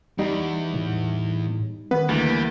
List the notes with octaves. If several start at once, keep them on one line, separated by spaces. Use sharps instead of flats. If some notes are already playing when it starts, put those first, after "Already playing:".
E2 G3 D#4
A2
D#3 B3 B4
D2 E3 G3 A#3